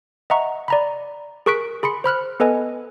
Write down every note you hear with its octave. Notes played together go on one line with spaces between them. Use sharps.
D#5 E5 F#5 A#5 C#6
D5 A#5 B5
G#4 A#4 C#6 F#6 B6 D7
G#4 B5 C6 C#7
C5 B5 F6 F#6
B3 A4 B4 D#5 G#5